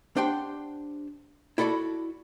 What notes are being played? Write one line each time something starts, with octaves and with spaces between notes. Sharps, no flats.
D4 G4 C5 F#5 G5 C6
E4 F#4 A4 D5 B5